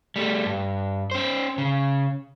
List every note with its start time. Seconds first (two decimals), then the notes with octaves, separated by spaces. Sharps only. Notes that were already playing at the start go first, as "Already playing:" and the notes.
0.16 G3 A3
0.45 G2
1.11 C#4 C5
1.58 C#3